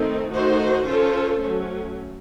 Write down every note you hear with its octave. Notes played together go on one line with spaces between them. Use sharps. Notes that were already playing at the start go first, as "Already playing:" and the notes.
Already playing: D#3 A3 C4 D#4
D#3 A3 D#4 F#4 C5
C#4 F4 A4 C5
F#3 A3 C#4